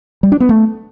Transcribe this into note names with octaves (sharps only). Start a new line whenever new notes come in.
G3
D4
B3
A3